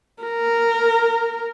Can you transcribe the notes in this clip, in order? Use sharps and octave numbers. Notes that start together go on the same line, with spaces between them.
A#4